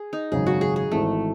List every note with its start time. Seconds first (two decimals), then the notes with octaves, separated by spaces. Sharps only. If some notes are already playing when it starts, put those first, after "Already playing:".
Already playing: G#4
0.13 D#4
0.32 G#1 F#2 C#3 G#4
0.47 F#4
0.61 G#4
0.76 G#4
0.91 G#1 G#2 E3 A3